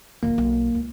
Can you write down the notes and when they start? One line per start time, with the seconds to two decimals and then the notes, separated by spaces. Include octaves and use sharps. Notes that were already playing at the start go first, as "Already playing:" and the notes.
0.23 D1 A#3 F4
0.38 B1
0.75 C#2